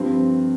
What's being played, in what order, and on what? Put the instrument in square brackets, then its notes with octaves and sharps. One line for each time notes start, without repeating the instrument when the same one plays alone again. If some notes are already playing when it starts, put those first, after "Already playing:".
Already playing: [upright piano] G2 F3 C4